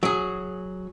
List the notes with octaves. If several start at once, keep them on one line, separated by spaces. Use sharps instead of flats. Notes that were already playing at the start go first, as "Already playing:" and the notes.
F#3 G#4